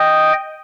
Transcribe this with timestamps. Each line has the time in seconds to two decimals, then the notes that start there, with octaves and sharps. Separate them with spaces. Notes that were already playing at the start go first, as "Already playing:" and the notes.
Already playing: D#5 G5